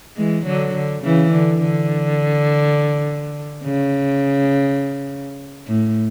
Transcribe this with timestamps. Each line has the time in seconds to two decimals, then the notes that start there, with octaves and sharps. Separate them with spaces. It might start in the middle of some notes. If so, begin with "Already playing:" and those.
0.17 E3 G#3
0.46 D3 F#3
0.74 D3
1.04 C#3 E3
1.32 D3
1.62 D3
3.64 C#3
5.67 A2